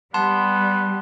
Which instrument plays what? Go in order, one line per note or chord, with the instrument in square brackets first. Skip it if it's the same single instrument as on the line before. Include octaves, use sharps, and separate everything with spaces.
[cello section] G3 [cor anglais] B3 [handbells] A5 C6